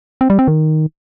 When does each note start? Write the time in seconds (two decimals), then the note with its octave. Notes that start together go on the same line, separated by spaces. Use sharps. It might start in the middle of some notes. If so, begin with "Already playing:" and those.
0.21 C4
0.30 G3
0.39 C4
0.48 D#3